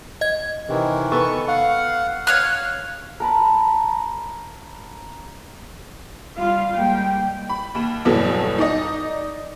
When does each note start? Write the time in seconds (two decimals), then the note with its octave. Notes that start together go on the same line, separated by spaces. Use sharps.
0.21 D#5 G#6
0.69 C3 D#3 E3
1.12 B3 A4 C#6
1.48 F5 F#5
2.27 C#5 F5 F#6
3.20 A#4 A5 B5
6.37 G3 F4 F5
6.76 G3 G#3 A#3 G5
7.49 B5
7.75 D#2 E7
8.05 G1 E2 B2 F#3 A4
8.58 D#4 D5 D#5